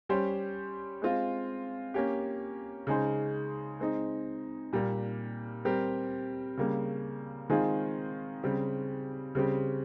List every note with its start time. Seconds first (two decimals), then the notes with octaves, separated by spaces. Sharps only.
0.09 G3 C#4 G4 C5
1.02 G#3 C4 F4
1.94 A#3 C#4 G4
2.87 C#3 G#3 D#4 G#4 C5
3.80 G#3 C4 D#4
4.73 A#2 G3 A#3
5.65 G3 C4 G4 A#4
6.57 C#3 G3 A#3
7.49 D#3 G#3 C4 F4 G#4
8.43 C#3 G3 C4 G4
9.35 C#3 G3 C4 G4